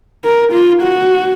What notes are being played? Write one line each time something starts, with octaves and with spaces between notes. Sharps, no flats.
A#4
F4
F#4